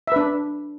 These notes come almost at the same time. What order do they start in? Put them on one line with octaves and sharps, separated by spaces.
E5 B4 D4